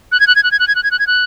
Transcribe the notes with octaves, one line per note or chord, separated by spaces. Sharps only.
F#6
G#6
F#6
G#6
F#6
G#6
F#6
G#6
F#6
G#6
F#6
G#6
F#6